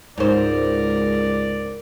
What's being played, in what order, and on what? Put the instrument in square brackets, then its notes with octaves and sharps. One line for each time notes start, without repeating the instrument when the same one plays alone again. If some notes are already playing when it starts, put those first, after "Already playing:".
[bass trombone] C#2 [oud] G#2 C5 [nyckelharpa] A#4 [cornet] D5